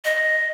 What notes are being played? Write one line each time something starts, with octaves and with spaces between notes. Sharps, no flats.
D#5